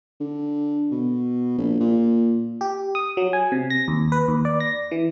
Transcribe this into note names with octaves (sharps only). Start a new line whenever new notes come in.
D3
B2
A#1
A#2
G4
D#6
F#3
G#5
C3
A#6
D#2
B4
D#2
D5
A#6
E3